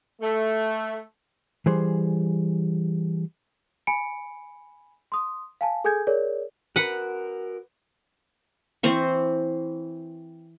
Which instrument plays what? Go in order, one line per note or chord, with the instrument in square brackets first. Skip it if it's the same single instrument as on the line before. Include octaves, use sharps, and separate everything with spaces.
[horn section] A3
[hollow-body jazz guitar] E3 G3 G#4 C5
[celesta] G#5 B5 C#7 D7
C6 D#6
F5 G#5 A5
G#4 A4 G#5 G6 G#6
G#4 A#4 C#5 D5
[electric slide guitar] F#4 A#4 [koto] B4 F#5
[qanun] E3 C4 C5 C#6